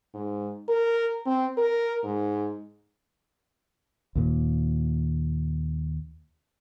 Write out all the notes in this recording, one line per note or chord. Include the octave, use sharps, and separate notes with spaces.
G#2
A#4
C4
A#4
G#2
D#2 A#2